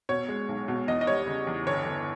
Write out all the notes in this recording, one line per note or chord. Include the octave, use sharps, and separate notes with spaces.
B2 C#5
G#3
B1
B2
E2 D#5
D#5
G3 C#5
C#3
E2
G1 C#5
G1